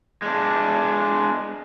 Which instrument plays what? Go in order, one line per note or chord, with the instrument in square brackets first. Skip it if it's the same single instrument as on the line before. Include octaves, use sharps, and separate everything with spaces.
[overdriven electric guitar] G#3 D4